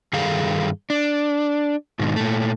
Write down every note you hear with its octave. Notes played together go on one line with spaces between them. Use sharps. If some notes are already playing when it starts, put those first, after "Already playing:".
G2 D#3 G#4 A4 F5
D4
G#2 B2 D#3
A#2 A3